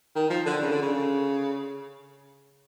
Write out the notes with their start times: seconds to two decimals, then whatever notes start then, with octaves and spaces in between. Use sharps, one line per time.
0.15 D#3
0.30 F3
0.46 D3
0.61 C#3
0.71 D3
0.82 C#3